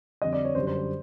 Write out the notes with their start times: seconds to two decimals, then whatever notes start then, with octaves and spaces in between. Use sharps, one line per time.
0.22 F2 D3 G3 D#5
0.33 D5
0.45 C#5
0.55 F#2 D3 G3 C5
0.67 C5
0.77 C5